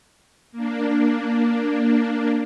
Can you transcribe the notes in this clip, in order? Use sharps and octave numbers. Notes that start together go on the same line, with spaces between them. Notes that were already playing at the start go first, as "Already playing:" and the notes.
A#3 D4